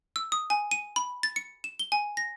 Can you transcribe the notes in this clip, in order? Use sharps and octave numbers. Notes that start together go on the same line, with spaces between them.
E6
D#6
G#5
D#7
B5
A6
C#7
E7
G7
G#5
A#6